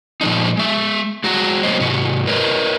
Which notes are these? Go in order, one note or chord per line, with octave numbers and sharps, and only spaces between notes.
A#2 F3 G#3 D4 D#4
G#3 E5
G#3 F#4 A#5
F#3 A#3 C5 D#5
G#2 C3 F#4
A#4 B4 C#5 D#5